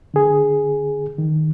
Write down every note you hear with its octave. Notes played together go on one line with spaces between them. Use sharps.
D3 G#4
D#3